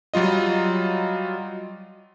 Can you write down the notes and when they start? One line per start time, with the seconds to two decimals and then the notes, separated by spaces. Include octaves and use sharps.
0.14 F#3 G3 F4 D#5